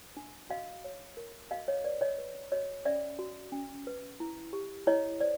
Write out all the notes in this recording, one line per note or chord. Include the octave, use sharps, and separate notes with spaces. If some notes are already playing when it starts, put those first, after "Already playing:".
D4
F#4 D#5 F5
C#5
A#4
F#4 D#5 F5
C#5 D#5
B4 D5
C#5 D#5
B4
F#4 C#5 D#5
C#4 D5 E5
F#4
C#4
B4
E4
G4
E4 C#5 D#5
C5 D5